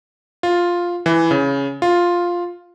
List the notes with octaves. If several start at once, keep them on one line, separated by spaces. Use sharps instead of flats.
F4
E3
C#3
F4